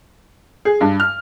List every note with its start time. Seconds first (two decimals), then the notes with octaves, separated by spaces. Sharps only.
0.65 G#4
0.81 G2
1.00 F6